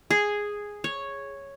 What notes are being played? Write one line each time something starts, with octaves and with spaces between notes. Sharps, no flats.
G#4
C#5